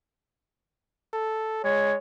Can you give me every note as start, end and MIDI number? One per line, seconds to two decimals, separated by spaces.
1.13 1.59 69
1.64 1.96 56
1.64 1.96 73